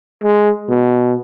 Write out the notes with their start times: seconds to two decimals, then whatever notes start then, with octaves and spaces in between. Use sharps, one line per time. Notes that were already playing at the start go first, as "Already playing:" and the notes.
0.23 G#3
0.68 B2